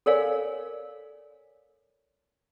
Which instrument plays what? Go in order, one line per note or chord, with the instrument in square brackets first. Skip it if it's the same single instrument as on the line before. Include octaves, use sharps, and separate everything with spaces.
[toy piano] A4 A#4 C#5 D5 F5 G#5